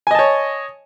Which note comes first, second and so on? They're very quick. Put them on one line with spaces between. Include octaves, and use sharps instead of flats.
G#5 D#5 A5 C#5